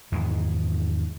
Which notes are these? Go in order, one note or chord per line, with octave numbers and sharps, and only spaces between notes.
E2 G#2 D#3 E3